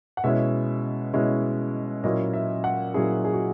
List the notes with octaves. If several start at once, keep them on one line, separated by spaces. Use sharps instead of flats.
F#5
B2 G#3 C#4 E4 E5
B2 G#3 C#4 E4
A#2 F#3 C#4 E4 D#5
E5
F#5
A#2 F#3 C#4 E4 G#4
G#4
F#4